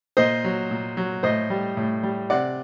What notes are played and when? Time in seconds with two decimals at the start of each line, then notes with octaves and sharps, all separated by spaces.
0.17 A#2 C5 D#5
0.44 F#3
0.71 A#2
0.97 F#3
1.23 A2 C5 D#5
1.50 G3
1.77 A2
2.03 G3
2.30 C3 D5 F#5